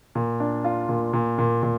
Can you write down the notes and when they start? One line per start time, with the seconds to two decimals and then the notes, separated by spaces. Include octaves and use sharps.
0.15 A#2
0.40 D4
0.64 F4
0.89 A#2
1.13 A#2
1.38 A#2
1.63 A#2